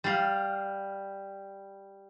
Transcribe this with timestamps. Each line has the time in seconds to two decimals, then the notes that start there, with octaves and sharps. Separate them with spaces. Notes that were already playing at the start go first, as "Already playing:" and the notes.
0.04 G3 F5